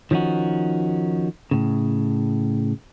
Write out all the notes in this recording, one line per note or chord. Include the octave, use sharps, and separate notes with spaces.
D#3 F3 C#4 D#4 F#4
A2 C#3